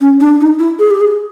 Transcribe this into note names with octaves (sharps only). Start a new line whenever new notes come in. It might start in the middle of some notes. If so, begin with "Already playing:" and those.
C#4
D4
D#4
E4
G#4
G4
G#4